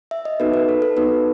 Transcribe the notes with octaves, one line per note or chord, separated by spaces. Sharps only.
E5
D#5
B3 D#4 F#4 A4 B4
B4
A4
A4
B3 D#4 F#4 A4 B4